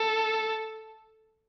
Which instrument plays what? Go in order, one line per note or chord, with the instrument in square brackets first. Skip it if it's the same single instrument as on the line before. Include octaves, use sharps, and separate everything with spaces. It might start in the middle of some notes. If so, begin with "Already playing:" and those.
Already playing: [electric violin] A4